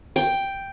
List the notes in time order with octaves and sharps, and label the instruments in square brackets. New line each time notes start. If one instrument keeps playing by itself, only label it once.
[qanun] G5